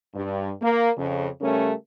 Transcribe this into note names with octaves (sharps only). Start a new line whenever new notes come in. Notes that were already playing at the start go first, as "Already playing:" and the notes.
G2
A#3
F2 C#3
C#3 G3 A3 C#4 A#4